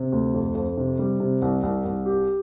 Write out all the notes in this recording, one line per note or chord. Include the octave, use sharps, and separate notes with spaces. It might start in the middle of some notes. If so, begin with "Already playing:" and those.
Already playing: C3
D2
F2
F2
C3
G3
C3
C2
C2
C2
G4